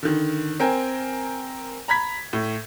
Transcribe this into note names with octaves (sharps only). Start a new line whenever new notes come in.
D3 D#3
C4 A#4 G5 G#5
A#5 B5 G#6 B6
A2